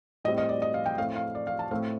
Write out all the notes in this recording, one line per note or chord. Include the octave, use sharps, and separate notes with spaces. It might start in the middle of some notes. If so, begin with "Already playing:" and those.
A2 G3 C4 D#5
D#5
D5
D#5
F5
G5
A2 A3 C4 F5
F5
D5
F5
A5
A2 A3 C4 F5